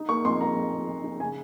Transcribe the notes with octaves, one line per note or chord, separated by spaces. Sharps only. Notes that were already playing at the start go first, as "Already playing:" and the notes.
Already playing: D#4
A#3 C#6
F2 C6
A#3 A#5
F2
A#3
F2
D#4
C#3 G#5